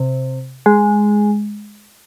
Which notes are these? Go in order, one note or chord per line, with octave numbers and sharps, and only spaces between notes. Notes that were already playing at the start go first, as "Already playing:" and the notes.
Already playing: C3
G#3